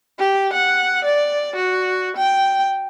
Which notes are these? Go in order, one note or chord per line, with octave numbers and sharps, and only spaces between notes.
G4
F#5
D5
F#4
G5